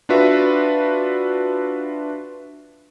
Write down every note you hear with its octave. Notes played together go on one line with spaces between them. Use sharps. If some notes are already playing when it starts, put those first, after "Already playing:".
D4 F4 F#4 B4 E5